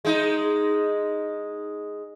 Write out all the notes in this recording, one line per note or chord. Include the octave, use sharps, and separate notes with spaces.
G#3 D#4